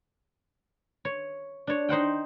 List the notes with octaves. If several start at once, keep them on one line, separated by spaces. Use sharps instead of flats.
C#5
D4 C#5
D#4 C5 F#5 G5